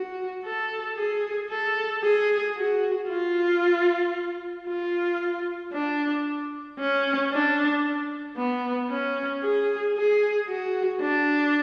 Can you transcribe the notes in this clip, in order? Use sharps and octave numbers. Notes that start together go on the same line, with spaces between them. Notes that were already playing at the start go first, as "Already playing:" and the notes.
Already playing: F#4
A4
G#4
A4
G#4
F#4
F4
F4
D4
C#4
D4
B3
C#4
G#4
G#4
F#4
D4